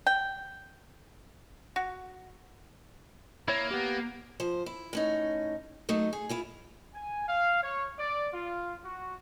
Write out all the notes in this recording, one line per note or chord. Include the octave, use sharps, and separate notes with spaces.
G5
F#4
A#3 E4 C#5
B3 G4
F3 C5
E4
A2 C#4 D#4
F#3 A3 D#4
G#4
E4 F4 G#4
G#5
F5
C#5
D5
F4
F#4